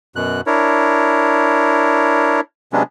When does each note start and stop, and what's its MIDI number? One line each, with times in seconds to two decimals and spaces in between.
0.16 0.41 42
0.16 0.41 47
0.16 0.41 90
0.47 2.40 62
0.47 2.40 64
0.47 2.40 70
0.47 2.40 73
2.73 2.83 48
2.73 2.83 54
2.73 2.83 56
2.73 2.83 59
2.73 2.83 61
2.73 2.83 62